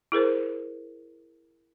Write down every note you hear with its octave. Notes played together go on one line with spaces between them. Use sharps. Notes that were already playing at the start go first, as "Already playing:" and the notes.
E4 G#4 A#4 C5